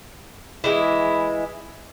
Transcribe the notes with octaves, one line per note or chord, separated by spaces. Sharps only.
E3 G#3 E4